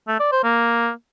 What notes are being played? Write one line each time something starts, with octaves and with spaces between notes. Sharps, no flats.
A3
D5
C5
A#3